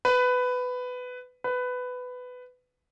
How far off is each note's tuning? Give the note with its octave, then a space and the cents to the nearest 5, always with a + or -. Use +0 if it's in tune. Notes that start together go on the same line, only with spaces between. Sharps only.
B4 +15
B4 +15